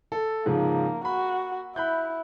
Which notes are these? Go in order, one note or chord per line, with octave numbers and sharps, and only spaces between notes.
A4
G#2 C#3 F3 A#3
F#4 B5
E4 B5 F#6 G6